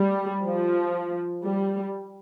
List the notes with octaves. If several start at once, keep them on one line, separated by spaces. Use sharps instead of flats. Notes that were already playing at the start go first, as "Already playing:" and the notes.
Already playing: G3
F3
G3